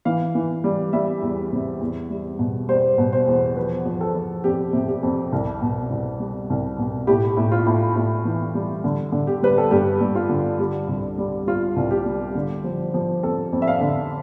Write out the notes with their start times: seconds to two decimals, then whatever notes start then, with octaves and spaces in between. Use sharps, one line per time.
0.05 E3 F5
0.35 E3
0.64 G3
0.93 G3 E5
1.22 E2
1.52 C3
1.81 E2
2.10 G3
2.39 B2
2.69 G3 C5
2.98 B2
3.13 C5
3.27 E2
3.56 F3 B4
3.85 F3
4.01 A4
4.15 F3
4.44 F2 G4
4.73 C3
4.88 G4
5.03 F2
5.33 C2
5.62 B2
5.90 C2
6.20 G3
6.50 C2
6.79 B2
7.07 A2 G4
7.37 A2
7.52 F4
7.66 A2
7.96 A2
8.25 E3
8.55 G3
8.84 D3
9.12 D3
9.27 G4
9.43 G3 B4
9.58 A4
9.71 G2 G4
10.01 G2
10.15 F4
10.29 D3
10.59 G3 G4
10.88 C2
11.18 G3
11.47 G3 F4
11.76 C2
11.91 G4
12.06 G3
12.35 D3
12.64 F3
12.94 F3
13.23 F2 A4
13.53 F2
13.62 E5
13.67 F5
13.81 D3